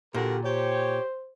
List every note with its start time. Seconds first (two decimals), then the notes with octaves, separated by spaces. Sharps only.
0.14 A#2 D3 F#4 G4 A#4
0.45 G4 C5 C#5